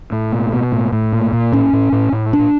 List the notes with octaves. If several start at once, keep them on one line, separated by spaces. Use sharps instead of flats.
A2
B2
B2
A2
A2
A#2
A#2
A2 C#4
A2
A2
A2
A#2 D4